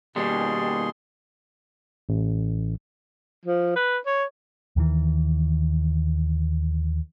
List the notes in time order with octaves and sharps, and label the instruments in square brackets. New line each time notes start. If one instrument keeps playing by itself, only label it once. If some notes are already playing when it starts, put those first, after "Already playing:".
[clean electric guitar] D#2 G3 [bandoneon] B2 G#4 C6
[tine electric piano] A1
[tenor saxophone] F3
B4
C#5
[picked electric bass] D#2 D#3 E3